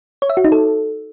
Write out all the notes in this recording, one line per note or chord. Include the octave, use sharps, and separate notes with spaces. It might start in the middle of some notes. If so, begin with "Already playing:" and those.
C#5
E5
F#4
D#4
A4